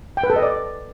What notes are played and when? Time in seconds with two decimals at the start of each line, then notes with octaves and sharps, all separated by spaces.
0.17 G5
0.23 B4
0.30 A4
0.36 D#5
0.42 D5